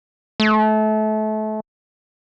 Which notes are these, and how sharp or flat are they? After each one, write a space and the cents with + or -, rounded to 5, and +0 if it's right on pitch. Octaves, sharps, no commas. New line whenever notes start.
A3 -30